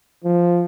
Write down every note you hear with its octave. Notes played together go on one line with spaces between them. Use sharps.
F3